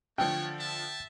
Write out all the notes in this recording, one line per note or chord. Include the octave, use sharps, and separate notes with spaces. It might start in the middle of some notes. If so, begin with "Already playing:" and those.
D3 F3 A3 C#5 G5
E5 A5